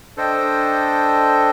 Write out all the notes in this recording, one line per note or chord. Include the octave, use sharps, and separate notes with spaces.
D4 A4 C5 D#5 G5